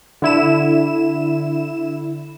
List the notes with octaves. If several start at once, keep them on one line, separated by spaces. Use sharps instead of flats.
D3 E4 E7